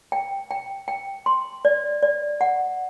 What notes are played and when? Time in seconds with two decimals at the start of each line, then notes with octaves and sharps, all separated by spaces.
0.12 G5
0.51 G5
0.88 G5
1.26 C6
1.65 D5
2.02 D5
2.41 F#5